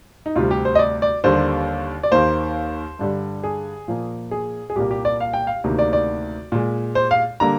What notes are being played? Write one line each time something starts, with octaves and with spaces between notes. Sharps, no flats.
D#4
D2 C3 G3 F4
G4
C5
D#5
D5
D5
D#2 D3 G3 A#3 C5
D5
D#2 D#3 A#3 C5
G2 D3 G3
G#4
A#2 F3 A#3
G#4
G#4
C2 A#2 G3 A#3 G4
G4
D5
F5
G5
F5
D2 C3 D#3 A#3
D5
D5
A#2 G#3
C5
F5
D3 G3 A#3 A#5